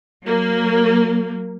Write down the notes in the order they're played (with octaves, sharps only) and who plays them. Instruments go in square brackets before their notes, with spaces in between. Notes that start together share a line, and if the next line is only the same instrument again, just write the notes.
[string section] F#3 A#3